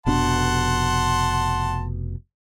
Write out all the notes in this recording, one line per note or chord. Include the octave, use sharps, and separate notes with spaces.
F1 B2 D4 F#5 A5 C6